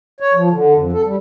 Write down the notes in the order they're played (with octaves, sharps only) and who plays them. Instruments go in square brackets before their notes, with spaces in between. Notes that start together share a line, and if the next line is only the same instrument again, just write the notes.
[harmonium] C#5
F3
D3
F2
A4
G3